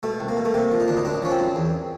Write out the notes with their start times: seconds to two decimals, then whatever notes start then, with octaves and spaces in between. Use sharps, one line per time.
0.03 B2 A3
0.20 C2
0.29 A#3
0.37 B2
0.45 A3
0.54 C3 A#3
0.72 F3
0.80 D#4
0.88 D2 D4
0.97 D#4
1.05 F#2 D4
1.22 F3 C#4
1.31 C4
1.39 F#2
1.56 E2